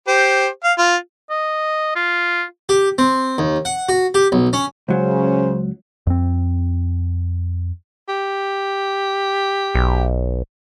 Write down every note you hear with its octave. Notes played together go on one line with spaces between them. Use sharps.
G4 C5
F5
F4
D#5
F4
G4
C4
D#2
F#5
F#4
G4
B1
C#4
C#2 C#3 F#3 C#4 C5
F2 C4
G4
B1